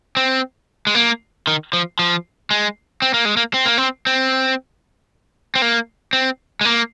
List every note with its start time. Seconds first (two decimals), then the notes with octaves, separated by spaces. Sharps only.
0.17 C4
0.87 G#3
0.95 A#3
1.47 D#3
1.73 F3
1.99 F3
2.51 G#3
3.02 C4
3.14 A#3
3.25 G#3
3.37 A#3
3.54 C4
3.66 A#3
3.78 C4
4.07 C4
5.55 C4
5.62 A#3
6.13 C4
6.61 G#3
6.65 A#3